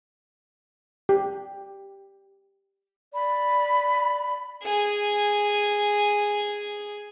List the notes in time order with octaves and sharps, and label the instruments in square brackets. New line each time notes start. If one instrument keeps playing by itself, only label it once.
[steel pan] G4
[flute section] D5 B5
[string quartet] G#4 G#5